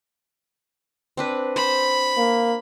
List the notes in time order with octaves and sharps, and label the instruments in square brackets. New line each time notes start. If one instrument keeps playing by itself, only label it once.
[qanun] C4 D4 B4
[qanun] C5 [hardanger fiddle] B5
[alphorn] A#3